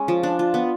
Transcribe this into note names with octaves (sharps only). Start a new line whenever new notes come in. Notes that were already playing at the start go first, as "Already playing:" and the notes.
Already playing: G#3 C#4
F3
D4
F4
B3